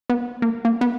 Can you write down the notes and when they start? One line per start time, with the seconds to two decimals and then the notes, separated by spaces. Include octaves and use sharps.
0.10 B3
0.42 A#3
0.65 A#3
0.81 B3